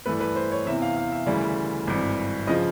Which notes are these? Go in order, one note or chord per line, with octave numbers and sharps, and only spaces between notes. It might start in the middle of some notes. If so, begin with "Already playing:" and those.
G2 E3 A3 B4
B4
C5
C#5
E2 C3 E3 E5
F5
F5
E5
D2 C#3 E3 G3
G#1 G2 E3
C#3 F3 D#5